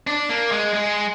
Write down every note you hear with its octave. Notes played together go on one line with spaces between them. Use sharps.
D4
A#3
G#3
G#3